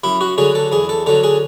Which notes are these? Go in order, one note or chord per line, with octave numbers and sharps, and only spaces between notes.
F#2 E4
F#4
D3 F#3 G#4
A4
E2 G#4
A4
D3 F#3 A4
G#4